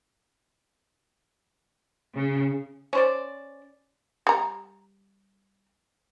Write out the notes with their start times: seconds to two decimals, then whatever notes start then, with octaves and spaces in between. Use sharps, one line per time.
2.16 C#3
2.93 C#4 C5 D5
4.27 G3 A#5